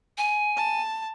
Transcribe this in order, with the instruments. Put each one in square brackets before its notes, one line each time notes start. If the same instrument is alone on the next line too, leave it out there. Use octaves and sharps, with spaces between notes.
[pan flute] G#5
[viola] A5